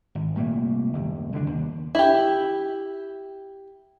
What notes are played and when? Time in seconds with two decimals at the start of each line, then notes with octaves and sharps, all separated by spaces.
0.15 G#1
0.35 C2 A#2 A3 A#3
0.93 F#1 D#2
1.32 C2 D3 G#3 D4
1.46 D#2
1.95 E4 G4